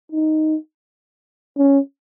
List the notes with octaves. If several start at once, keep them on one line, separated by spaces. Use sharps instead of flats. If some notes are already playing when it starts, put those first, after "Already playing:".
D#4
C#4